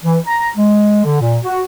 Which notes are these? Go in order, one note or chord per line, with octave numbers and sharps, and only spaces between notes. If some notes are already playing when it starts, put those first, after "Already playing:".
E3
A#5
G#3
D3
A#2
F#4